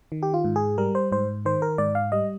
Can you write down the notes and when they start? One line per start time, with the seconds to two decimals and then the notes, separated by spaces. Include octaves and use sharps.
0.12 D#3
0.23 G4
0.34 F4
0.44 G#2
0.56 G#4
0.78 G3 A#4
0.95 C5
1.12 G#2 C5
1.45 D#3 C5
1.62 A#4
1.78 G#2 D5
1.95 F5
2.12 G3 D#5